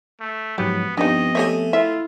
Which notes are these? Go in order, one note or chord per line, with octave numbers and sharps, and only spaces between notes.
A3
G#2 F3 F#3 B3 G4
G2 F3 B3 C4 D4 D#4 D#5
A3 G4 C#5 E5 G#5
E4 F4 E5